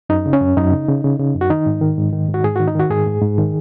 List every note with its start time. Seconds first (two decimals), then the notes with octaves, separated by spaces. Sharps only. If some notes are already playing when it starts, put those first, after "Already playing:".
0.09 F#2 D#4
0.26 C#3
0.33 C#4
0.41 F#2
0.57 F#2 D#4
0.72 C#3
0.89 C#3
1.04 C#3
1.19 C#3
1.35 F#2
1.41 F#4
1.50 D#3 D#4
1.66 G#2
1.82 D#3
1.97 G#2
2.12 D#3
2.28 G#2
2.34 F#4
2.44 G#2 G#4
2.56 D#3 F#4
2.68 D#4
2.75 D#3 F#4
2.90 G#2 G#4
3.07 G#2
3.22 G#2
3.38 D#3